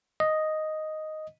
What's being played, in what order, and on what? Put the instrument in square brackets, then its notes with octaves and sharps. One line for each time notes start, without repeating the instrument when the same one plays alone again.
[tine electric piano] D#5